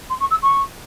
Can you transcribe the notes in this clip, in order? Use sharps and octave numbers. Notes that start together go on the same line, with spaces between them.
C6
C#6
E6
C#6